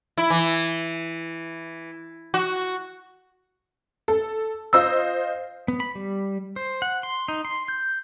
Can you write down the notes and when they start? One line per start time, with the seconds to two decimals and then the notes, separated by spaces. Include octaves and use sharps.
0.18 E4
0.30 E3
2.34 F#4
4.08 A4
4.73 F4 C5 D#5 E6
5.68 B3
5.80 B5
5.95 G3
6.56 C5
6.82 F#5
7.03 C6
7.28 D#4
7.45 C6
7.68 G6